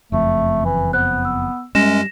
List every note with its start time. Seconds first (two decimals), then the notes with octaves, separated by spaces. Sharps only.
0.12 F#1 F2 A3
0.65 E3
0.93 B3 C5 F#6
1.25 E6
1.75 F#2 G3 G#3 C#4 A#6 E7